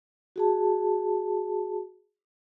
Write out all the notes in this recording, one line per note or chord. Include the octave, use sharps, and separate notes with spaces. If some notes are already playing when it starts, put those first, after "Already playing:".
F#4 G#4 A5